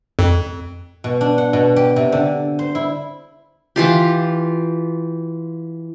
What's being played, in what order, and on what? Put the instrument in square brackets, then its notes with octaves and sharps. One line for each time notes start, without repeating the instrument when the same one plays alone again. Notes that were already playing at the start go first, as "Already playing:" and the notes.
[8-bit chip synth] F2
[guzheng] B2
D4
F#5
B2
G4
C3
D3
C5
E4
[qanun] E3 F4 G4